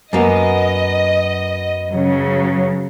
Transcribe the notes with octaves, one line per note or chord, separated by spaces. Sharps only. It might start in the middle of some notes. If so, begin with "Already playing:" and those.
F#2 A#3 B3 D#5
C#3 F#3